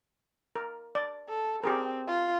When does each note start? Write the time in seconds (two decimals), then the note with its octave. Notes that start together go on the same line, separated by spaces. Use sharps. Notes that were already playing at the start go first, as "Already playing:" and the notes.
0.56 A#4
0.95 D5
1.29 A4
1.64 C4 G4 G#4 A#4
2.07 F4